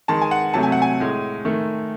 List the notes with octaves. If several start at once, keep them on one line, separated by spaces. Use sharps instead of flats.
D#3 G#3 A5
G#5
F#5
C3 F#3 A3 A5
G#5
F#5
G#5
A2 G#3
D#3 A3